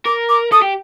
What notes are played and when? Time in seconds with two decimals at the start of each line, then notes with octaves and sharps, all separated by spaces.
0.05 A#4 D6
0.29 D6
0.52 A4 D#6
0.62 G4